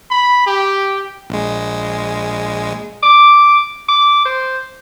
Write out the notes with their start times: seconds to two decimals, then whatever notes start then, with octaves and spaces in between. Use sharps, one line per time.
0.11 B5
0.47 G4
1.30 A#1 G#3
3.03 D6
3.89 D6
4.25 C5